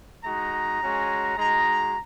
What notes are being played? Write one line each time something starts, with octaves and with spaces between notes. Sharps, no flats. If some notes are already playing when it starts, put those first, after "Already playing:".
G#3 D#4 F#4 A#5
G#3 C#4 F#4
G#3 D#4 F#4 A#5